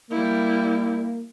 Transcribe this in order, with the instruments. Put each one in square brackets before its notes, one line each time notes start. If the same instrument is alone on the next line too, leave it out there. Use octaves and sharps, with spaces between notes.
[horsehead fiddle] G3 E4 [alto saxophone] A#3